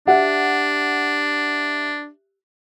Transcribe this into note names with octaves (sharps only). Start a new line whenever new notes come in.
D4 G4 E5 F#5